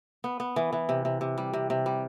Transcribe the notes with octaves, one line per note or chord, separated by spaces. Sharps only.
B3
B3
E3
E3
C3
C3
C3
G3
C3
C3
G3